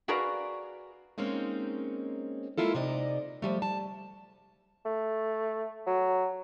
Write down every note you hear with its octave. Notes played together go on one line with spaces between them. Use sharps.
F#4 G#4 A#4 B4 D5 F5
G#3 A#3 C4 C#4 D#4
G#3 A#3 E4 F4 A4
C3 D#4 D5 D#5
F3 G3 A3
A5
A3
F#3